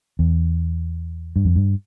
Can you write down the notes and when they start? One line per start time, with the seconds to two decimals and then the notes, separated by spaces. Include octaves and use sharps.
0.19 E2
1.36 G2
1.45 F2
1.56 G2